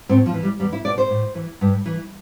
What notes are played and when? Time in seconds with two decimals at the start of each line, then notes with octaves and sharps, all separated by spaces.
0.09 A2 C4
0.26 F3
0.34 E3
0.43 G3
0.60 E2 G3
0.73 E4
0.84 B2 D5
0.98 C5
1.10 A2
1.35 E3
1.61 G2
1.86 E3